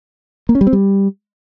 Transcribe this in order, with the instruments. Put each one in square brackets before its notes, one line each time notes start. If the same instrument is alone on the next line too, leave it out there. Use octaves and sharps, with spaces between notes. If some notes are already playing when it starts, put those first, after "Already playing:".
[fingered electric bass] A#3
C#4
G3
C4
G3